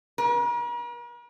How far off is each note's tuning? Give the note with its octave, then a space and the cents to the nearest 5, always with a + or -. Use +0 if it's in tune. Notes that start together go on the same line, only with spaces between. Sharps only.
A#4 +45